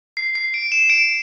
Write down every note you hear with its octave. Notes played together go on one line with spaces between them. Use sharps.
C7
C7
D7
E7
D7